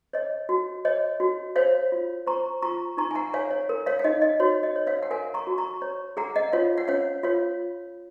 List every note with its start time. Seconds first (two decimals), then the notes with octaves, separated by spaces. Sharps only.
0.13 C#5 D#5
0.49 F#4
0.85 C#5 D#5
1.20 F#4
1.56 C5 C#5 F5
1.92 F4
2.27 C5 A#5 C#6
2.62 F4 A#5 C#6
2.97 D#4 A#5 C#6
3.11 G#5
3.15 F#5 A#5
3.34 C#5 F5 G#5
3.51 C#5
3.69 A#4
3.86 C#5 F5
3.99 F5
4.04 D#4 D#5
4.22 D#5
4.40 F#4 C#5
4.63 D#5
4.76 C#5
4.87 C#5 F5
5.03 F#5
5.11 A#4 F5 G#5
5.34 A#5 C#6
5.47 F#4
5.58 A#5 C#6
5.82 C#5
6.17 G#4 F#5 A#5
6.36 D#5 F#5
6.53 F4 C#5 F5
6.78 F#5
6.88 C#4 C#5 F5
7.23 F4 C#5 F5